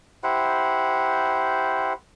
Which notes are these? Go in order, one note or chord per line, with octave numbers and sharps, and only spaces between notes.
E4 G4 C5 F#5